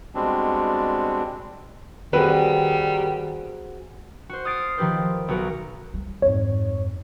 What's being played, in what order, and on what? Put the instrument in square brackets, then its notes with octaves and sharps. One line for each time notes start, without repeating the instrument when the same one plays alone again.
[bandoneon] B2 G3 G#3 C4 D4
[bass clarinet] D#3 [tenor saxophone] G3 [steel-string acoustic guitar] C4 F#4 G#4 [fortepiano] B4
[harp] F#4 C5
D#6 F6 A6 C7 D7
D#3 F3 G4 B4 C5
B1 F#4 A#4
[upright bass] G3
[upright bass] F2 G#2 [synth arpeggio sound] C#5